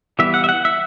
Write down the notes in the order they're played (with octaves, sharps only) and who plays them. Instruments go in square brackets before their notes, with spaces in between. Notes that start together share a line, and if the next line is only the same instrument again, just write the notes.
[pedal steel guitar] E3 G3 B3 E5
F#5
E5
F#5
E5